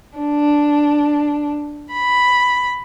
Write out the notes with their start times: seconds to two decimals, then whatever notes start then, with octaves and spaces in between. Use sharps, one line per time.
0.19 D4
1.93 B5